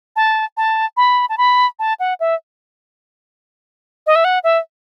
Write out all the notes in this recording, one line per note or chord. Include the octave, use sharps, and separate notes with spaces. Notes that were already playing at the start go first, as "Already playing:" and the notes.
A5
A5
B5
A5
B5
A5
F#5
E5
D#5
E5
F#5
E5